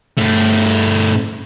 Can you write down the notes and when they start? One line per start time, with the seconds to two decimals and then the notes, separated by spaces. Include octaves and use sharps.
0.18 G2 A3